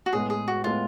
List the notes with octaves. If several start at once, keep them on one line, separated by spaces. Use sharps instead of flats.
F#4
A2 G#3 B3 G#4
G#4
F#4
A2 G#3 B3 F4